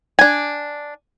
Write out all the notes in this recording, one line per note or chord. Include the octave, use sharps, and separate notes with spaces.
D4 G#5